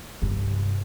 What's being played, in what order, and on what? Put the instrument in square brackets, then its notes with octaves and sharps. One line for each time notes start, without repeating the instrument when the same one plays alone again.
[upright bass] G2 C3